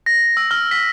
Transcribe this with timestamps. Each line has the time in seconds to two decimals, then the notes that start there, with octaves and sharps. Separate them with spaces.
0.06 A#6
0.37 E6
0.51 F6
0.71 B6